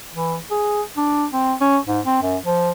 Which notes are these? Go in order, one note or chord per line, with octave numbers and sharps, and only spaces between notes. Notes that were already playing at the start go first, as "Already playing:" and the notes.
E3
G#4
D4
C4
C#4
G#2
C4
F#2
F3